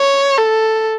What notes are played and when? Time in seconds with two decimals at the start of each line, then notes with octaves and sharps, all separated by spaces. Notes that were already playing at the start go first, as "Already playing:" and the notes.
Already playing: C#5
0.38 A4